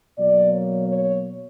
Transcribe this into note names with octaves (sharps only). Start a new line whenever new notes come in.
B2 F#3 A#3 D5
C#5
C#5